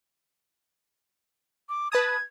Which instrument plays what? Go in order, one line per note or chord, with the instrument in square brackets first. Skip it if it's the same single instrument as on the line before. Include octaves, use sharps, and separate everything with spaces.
[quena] D6
[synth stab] B4 A5 D#6 [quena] G#6